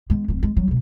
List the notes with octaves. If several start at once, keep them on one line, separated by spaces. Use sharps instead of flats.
G#3 B3
D1 C4
G#3
F#3 G3
C#2 B2